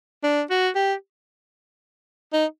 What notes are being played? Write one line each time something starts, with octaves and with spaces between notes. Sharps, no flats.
D4
F#4
G4
D#4